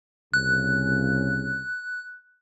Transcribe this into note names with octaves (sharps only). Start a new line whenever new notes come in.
C2 C#3 F#6